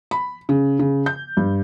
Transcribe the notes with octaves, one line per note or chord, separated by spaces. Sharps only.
B5
C#3
C#3
G6
G2